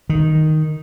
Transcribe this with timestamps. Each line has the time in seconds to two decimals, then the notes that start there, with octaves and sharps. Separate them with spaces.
0.09 D#3